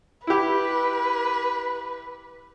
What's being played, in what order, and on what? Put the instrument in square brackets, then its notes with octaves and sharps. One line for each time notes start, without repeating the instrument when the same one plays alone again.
[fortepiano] E4 G4 [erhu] B4